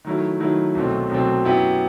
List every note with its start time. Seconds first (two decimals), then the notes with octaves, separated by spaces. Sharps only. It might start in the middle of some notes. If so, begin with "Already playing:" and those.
0.05 D#3 F#3 A3 E4
0.40 D#3 F#3 A3 E4
0.75 C2 B2 F#3 A3 C4
1.09 C2 B2 F#3 A3 C4
1.45 F#2 F#3 B3 E4 G4